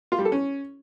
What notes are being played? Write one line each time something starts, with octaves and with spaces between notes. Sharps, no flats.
F4
G3
A4
C#4